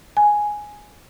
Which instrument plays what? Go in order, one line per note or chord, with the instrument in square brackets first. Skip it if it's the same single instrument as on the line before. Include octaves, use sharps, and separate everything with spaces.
[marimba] G#5